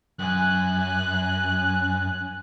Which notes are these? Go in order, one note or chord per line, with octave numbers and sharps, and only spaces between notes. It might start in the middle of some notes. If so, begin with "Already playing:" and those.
F#2 G#5 F#6